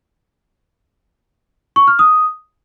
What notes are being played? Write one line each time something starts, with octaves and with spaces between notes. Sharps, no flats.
C#6
F6
D#6